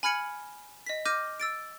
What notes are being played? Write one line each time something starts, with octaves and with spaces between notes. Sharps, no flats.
G#5 B5 F6 G#6 C#7 F#7
D#5 B6
D6 F6 G6 A#6 D#7
E6 A6 D7